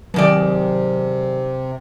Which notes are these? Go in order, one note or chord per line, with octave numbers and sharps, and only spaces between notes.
G#2 C3 D#3 F#3 D5